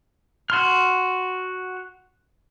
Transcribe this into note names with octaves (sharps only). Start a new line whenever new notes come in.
F#4 C6 F6